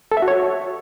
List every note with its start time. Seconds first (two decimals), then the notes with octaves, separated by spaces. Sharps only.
0.12 A4
0.17 E5
0.22 F#4
0.28 C#5